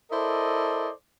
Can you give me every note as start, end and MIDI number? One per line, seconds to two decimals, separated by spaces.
0.11 0.90 64
0.11 0.90 69
0.11 0.90 70
0.11 0.90 72
0.11 0.90 74
0.11 0.90 75